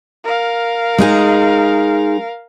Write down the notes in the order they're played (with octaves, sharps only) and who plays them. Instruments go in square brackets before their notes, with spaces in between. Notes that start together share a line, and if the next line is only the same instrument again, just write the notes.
[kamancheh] A#4 F5
[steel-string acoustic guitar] G#3 D#4 G#4